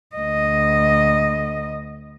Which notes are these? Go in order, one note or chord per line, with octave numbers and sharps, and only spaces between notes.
D2 D#5